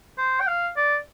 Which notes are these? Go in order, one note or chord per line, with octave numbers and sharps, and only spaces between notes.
C5
G5
F5
D5